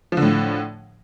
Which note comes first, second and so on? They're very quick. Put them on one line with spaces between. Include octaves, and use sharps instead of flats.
F3 D3 A2